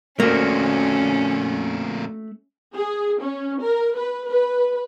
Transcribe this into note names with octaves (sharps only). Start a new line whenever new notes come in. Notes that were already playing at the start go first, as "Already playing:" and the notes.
F2 A#2 A3 A#3 C#4 F#4
G#4
C#4
A#4
B4
B4